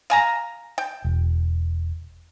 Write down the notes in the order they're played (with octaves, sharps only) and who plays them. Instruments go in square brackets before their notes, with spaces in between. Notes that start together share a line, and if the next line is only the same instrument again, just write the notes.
[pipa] F5 G#5 A#5
G5
[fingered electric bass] E1